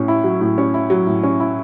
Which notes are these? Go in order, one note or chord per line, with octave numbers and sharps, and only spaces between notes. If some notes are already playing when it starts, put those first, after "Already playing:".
Already playing: A2 C#4
E4
F#3
A2
C#4
E4
F#3
A2
C#4
E4